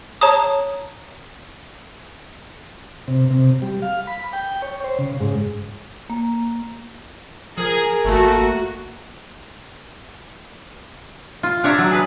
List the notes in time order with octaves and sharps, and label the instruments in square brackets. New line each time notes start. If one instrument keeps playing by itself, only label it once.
[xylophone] C#5 A5 A#5 D#6
[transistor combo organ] C3
C3
G3
F5
B5
G5
C#5
C5
C#3
G#2
[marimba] A#3
[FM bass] F3 [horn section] G#4 [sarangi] A#4
[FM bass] G#1 [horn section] A3 [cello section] A#3 F#4
[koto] F4
D4 C#5 E5 A#5
F#3
G#4 B4